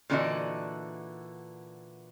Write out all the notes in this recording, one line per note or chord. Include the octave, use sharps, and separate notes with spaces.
A#2 D3 E3 D4 F#4 D#5